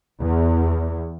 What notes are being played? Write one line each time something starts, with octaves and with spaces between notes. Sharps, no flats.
E2